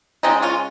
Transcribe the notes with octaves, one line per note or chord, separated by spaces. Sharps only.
C#3 F3 G#3 C4 D#4
C#4 F4